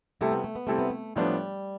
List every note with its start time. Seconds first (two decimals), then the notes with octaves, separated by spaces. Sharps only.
0.21 C3 G3 A3 C4 E4 A4
0.32 B3
0.44 A3
0.55 B3
0.67 C3 G3 A3 C4 E4 A4
0.79 B3
0.90 A3
1.16 A2 F3 G3 B3 D4